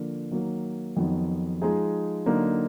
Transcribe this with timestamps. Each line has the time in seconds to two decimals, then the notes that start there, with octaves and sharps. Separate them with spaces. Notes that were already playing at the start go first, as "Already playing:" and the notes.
Already playing: D3 F3 A#3
0.31 D#3 F#3 A#3
0.96 F2 D#3 F#3 B3
1.62 F3 G#3 D#4 G#4
2.26 D3 F#3 A#3 D#4